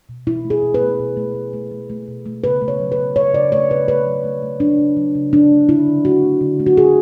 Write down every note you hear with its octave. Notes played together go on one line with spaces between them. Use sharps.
B2
B2 E4
A3
G#4
B2
B4
A3
B2
A3
A3
A3
A3
A3
B2
A3
C#3 B4
A3
C#5
F#3
B4
C#3
A3 C#5
C#3 D5
A3 C#5
C#3 B4
A3 B4
F#3
A3
A3
F#3 D4
C#3
F#3
C#3
F#3 D4
A3
D3 E4
D3
A3 F#4
A3
D3
A3
F#4
D3 G#4